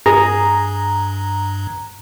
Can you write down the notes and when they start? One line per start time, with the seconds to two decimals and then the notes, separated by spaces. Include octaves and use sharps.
0.06 G2 G#4 A#5